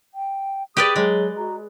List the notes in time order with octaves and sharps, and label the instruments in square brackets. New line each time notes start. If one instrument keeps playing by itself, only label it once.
[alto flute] G5
[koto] G4 B4 D5 [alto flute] G#4 [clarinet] D#6
[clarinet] F#3 [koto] G#3
[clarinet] F#4 [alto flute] A#5